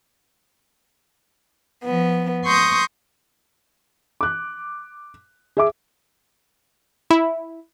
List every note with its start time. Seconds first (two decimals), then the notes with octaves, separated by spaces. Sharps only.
1.83 F3 B3
2.46 C6 C#6 D#6 G6 A#6
4.21 D6 F#6
5.57 G#4 E5 D6
7.10 E4